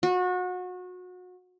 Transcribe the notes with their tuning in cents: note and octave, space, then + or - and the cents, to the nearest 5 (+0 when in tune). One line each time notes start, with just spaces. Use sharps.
F#4 -30